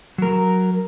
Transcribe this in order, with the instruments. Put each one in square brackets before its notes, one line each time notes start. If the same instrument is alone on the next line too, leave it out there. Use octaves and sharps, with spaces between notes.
[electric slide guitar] F#3 A#4